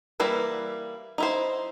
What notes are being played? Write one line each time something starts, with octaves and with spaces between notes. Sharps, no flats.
E3 G3 A#3 E4 B4
D#4 E4 C5